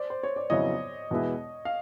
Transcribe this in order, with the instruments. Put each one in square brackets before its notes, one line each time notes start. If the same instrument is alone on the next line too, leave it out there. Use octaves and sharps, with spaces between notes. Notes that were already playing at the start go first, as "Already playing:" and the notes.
Already playing: [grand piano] C5 D5
C5
C#5
D5
[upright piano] F2 C#3 F#3 B3 E4 [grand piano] C#5 D#5
[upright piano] E2 B2 G#3 B3 E4
[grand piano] F5